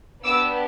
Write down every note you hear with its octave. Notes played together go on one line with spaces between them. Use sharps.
B3 D4 G4 D6 E6